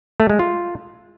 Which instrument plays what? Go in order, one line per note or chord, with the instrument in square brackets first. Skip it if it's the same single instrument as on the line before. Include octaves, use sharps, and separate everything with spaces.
[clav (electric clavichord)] A3
G#3
F4